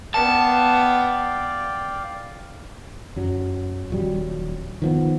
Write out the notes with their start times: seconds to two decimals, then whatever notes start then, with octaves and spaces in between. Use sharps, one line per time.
0.14 B3 D5 F5 G5 A5
3.16 F#2 F#3
3.90 D#1 F#3 G3
4.82 D#3 F3 B3